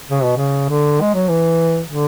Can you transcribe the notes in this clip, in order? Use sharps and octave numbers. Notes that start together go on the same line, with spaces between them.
C#3
B2
C#3
D3
G#3
F#3
E3
D3